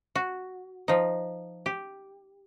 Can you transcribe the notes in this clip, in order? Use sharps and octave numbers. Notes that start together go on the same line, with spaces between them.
F#4
F3 D#4
G4